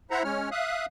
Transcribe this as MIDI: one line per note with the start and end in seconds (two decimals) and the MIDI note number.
0.11 0.23 64
0.11 0.23 72
0.11 0.23 76
0.11 0.23 78
0.11 0.23 82
0.24 0.49 56
0.24 0.49 61
0.24 0.49 73
0.24 0.49 89
0.52 0.86 76
0.52 0.86 77
0.52 0.86 87
0.52 0.86 90